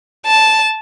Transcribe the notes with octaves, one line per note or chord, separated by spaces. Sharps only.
A5